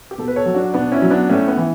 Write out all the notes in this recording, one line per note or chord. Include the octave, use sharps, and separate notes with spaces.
G4
B2 A4
B4
A4 C#5
F#3
D4 F#4
B2 B3 D4
C#4 E4
F#3
B3 D4
A2 A3 C#4
B3
E3